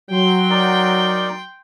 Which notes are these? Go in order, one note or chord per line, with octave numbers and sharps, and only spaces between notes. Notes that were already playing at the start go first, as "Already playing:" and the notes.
F#3 G5 C6
D#4 A#4 D5